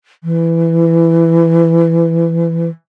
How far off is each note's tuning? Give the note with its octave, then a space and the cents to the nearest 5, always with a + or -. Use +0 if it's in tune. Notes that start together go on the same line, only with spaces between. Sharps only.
E3 +15